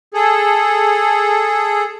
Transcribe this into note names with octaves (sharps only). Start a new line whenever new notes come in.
G#4 A4